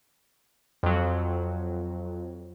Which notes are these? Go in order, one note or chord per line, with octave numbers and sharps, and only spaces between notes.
F2 F#3